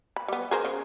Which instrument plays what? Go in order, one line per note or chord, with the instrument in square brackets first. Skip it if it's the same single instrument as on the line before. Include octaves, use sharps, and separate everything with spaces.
[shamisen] B5
G3 B3
G#4 A#4 C5
C#3